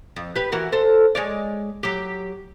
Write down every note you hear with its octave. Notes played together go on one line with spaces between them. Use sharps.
F2
G4 B4
E3 F#4 A#4
A4 C5
G#3 C#5 D5
F#3 G4